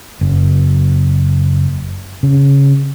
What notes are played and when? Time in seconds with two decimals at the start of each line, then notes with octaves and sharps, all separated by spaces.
0.21 F#1
2.23 C#3